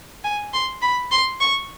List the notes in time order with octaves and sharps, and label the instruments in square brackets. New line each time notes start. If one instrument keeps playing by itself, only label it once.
[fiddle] G#5
C6
B5
C6
C#6